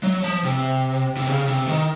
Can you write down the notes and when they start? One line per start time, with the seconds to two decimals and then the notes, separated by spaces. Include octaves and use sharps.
0.03 F#3
0.24 F3
0.45 C3
1.17 C3
1.27 C#3
1.48 C3
1.68 D#3